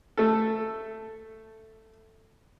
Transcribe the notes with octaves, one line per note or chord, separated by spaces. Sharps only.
A3 A4